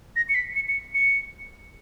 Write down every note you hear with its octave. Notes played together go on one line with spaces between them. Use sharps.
A#6
C#7
B6
C#7
C#7
C#7